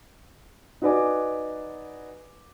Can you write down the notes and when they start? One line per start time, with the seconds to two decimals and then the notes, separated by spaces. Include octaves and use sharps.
0.82 D#4 F#4 B4 D5 G#5 D6